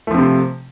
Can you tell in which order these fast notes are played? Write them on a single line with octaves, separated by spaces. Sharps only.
A3 F3 C4 C3